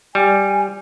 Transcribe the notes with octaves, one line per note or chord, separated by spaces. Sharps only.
G3 G#5